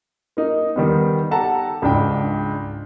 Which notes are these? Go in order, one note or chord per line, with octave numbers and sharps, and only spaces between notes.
A#3 D#4
D#3 G3 B3
G4 A4 F#5 A5 A#5
C#2 G#2 D4 G5